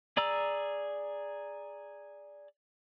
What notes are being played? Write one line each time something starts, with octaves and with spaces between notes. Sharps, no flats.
G#4 D5 A#5 E6